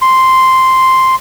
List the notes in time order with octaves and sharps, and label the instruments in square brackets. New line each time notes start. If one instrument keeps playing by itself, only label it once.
[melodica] C6